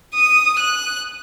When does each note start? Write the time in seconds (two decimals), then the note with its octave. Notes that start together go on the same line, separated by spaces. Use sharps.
0.14 D#6
0.59 F#6